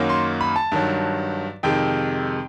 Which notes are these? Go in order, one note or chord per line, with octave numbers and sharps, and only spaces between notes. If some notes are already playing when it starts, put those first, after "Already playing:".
Already playing: F#2 D#3 F#3 A#3 C#4
C6
B5
A5
G2 D#3 F#3
F2 C3 D#3 G#3 G5